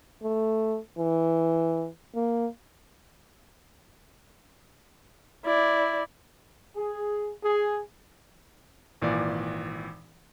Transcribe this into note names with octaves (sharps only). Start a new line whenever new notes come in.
A3
E3
A#3
E4 D5
G#4
G#4
G#1 A#2 E3 D5